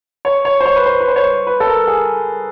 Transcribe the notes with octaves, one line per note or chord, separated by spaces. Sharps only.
C#5
C#5
C5
C#5
B4
C5
B4
C5
C#5
B4
A4
A#4
G#4